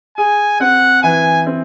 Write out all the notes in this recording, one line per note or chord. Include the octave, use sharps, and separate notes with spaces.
G#4 G#5
C4 F#5
E3 G#5
C4